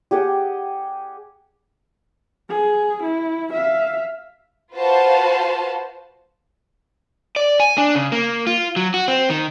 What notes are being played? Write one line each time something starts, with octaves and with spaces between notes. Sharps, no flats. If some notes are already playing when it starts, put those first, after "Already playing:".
G4 G#4 F#5 G5
G#4
E4
E5 F5
F4 F#4 B4 C5 F5 A5
D5
G#5
D4
C#3
A#3
F4
F#3
F#4
C4
D#3